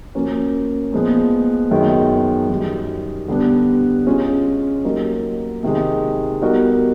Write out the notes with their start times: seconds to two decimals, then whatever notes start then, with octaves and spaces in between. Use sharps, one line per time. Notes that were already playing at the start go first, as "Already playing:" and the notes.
0.15 F3 A#3 C#4 F#4 A#4
0.93 A#2 F3 G#3 B3
1.71 F#2 D#3 G#3 B3
2.49 F#2 D#3 G3
3.28 D3 G3 B3 D4
4.07 G#3 C#4 F4
4.85 F#3 A#3 D#4 G4 A#4
5.63 C3 D#3 G#3
6.42 G3 B3 D#4 F#4 A#4